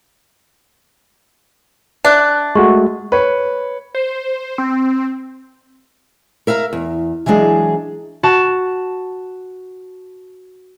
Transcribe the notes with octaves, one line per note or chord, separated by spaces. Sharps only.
D4 E5 F#6
G#3 A3 F#4 C#6
B4 C#5
C5
C4
A#4 E5 F5 A#5
E2
E3 F#3 G#3 D4 G#4
F#4 A5